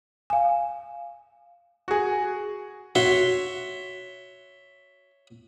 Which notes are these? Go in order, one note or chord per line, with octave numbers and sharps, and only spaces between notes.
F5 G#5
F#4 G#4
F#4 C#5 E5 C6